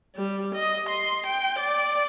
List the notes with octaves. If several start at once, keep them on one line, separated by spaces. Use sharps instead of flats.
G3
D#5
C6
G5
D5